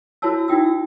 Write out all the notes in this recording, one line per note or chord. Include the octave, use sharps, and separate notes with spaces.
E4 F#4 C5 C#5 A5 E6
D#4 E4 F#4 G5 D#6 E6